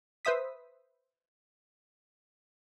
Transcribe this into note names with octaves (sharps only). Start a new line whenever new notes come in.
B4 C5 E5 D#6 B6